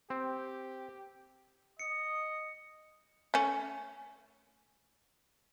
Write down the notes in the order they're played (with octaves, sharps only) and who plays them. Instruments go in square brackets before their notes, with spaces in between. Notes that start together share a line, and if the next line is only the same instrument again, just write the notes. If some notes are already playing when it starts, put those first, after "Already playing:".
[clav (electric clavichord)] C4 [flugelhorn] G4
[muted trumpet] D#5 [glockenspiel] C#7
[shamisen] A3 C#4